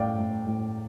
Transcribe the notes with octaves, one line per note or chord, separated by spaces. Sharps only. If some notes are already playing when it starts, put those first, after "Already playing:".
Already playing: A2 A3 D5 F5 G5
A2
A2